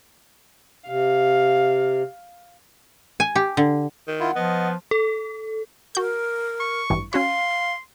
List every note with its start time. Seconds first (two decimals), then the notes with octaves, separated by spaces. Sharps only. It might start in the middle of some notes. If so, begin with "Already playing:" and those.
0.88 C3 F5
3.20 G#5
3.36 G4
3.57 D3
4.07 D#3
4.20 E4 F4 F#5
4.36 F3 B3 D#5
4.91 A4
5.95 F#4 A#4 G6
6.60 C#6
6.90 A1 G2 E3
7.13 C#4 F#4 C#5 F5 C6